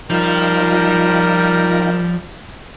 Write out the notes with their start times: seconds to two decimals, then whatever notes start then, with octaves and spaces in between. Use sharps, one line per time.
0.10 F3 G3 D#4 F4 A#4 G5